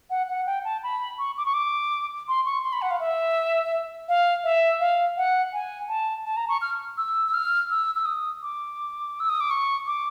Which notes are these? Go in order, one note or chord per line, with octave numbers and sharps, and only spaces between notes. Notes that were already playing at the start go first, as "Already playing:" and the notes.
F#5
F#5
G5
A5
B5
C#6
D6
C#6
D6
C6
C#6
C6
B5
F#5
F5
E5
F5
E5
F5
F#5
G#5
A5
A5
A#5
C#6
F6
E6
E6
F6
E6
E6
D#6
D6
E6
D#6
D6
C#6
D6